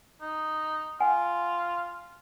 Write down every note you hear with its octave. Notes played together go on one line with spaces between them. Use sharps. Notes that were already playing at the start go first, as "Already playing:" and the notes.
D#4
F4 F#5 G#5